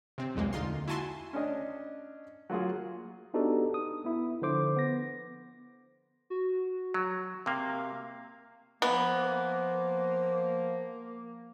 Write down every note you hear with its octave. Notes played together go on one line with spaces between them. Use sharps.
C3 C4
B1 E2 A#2 G#3 A#3
D2 D3 D#4 F4 C6
E4 F#4 G#5 A5 C6
C#4 D4 D#5
F#3 A#3 F4 G#4
B3 D4 D#4 F#4 G4 A4
D#6
B3 E4
D3 F3 C5 D6
B3 A#6
F#4
F#3
C3 A#3 F5
F3 A#3 B3